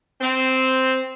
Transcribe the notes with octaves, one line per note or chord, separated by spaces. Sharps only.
C4